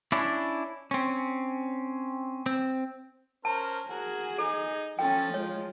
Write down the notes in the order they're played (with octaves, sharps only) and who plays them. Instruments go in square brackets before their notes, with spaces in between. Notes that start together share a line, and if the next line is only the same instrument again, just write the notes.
[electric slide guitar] C#4 D4 E4
C4 C#4
C4
[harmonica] C#4 A#4 C5 [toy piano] A5
[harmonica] F#4 A#4 [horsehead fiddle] G#4
[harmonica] D#4 [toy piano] A4
[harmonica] F3 [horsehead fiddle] C#4 A4 [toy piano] G5
[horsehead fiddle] G#3 F4 [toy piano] C#5